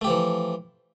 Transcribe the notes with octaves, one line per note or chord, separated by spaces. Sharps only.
E3 F3 A3 G4